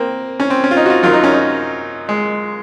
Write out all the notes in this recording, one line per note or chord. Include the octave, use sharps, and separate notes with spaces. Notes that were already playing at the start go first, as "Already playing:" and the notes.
Already playing: A#3 C4
C#4
C4
C#4
F4
D#4
F#4
F4
F#2 D#3 F#3 F4
D#4
C#4
D#4
G#3